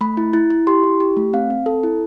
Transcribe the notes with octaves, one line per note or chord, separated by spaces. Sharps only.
A3 B5
E4
E4
E4
G4 C6
E4
G4
A3
C4 F5
C4
A4
E4